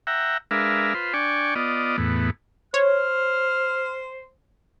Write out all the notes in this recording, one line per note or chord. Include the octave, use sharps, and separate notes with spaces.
E5 F#5 G5 A#5
G#3 D4 A#4 B4 E5 F5
F4 B4 C5
D4 D5 G5 G#5 C#6
B3 F4 D5 D#5
E2 A2 B3
C5 C#5 F6